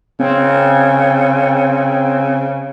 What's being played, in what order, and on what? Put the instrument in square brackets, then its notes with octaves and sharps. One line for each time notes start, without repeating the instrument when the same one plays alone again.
[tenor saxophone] C#3 [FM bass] C4